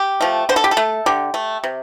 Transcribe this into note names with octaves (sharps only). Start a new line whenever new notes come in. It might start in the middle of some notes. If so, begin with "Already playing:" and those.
Already playing: G4
F3 A3
D3 C5
A4
G4
A4
A3
D3 G4
A3
C3